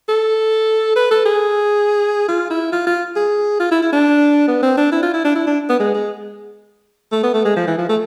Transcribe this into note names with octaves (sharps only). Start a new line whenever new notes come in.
A4
B4
A4
G#4
F4
E4
F4
F4
G#4
F4
E4
E4
D4
B3
C4
D4
E4
F4
E4
D4
E4
D4
B3
G#3
G#3
A3
B3
A3
G#3
F3
E3
F3
A3